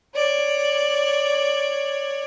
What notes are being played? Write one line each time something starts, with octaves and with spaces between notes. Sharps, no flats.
C#5 D5